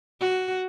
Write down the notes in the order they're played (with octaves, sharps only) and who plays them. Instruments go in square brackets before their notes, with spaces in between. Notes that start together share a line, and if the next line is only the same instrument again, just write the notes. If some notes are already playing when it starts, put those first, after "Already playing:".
[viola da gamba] F#4